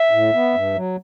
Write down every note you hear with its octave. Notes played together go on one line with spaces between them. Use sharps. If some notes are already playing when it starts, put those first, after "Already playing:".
Already playing: E5
A2
B3
G2
F#3